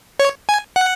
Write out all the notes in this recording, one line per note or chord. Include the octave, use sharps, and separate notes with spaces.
C#5
G#5
F#5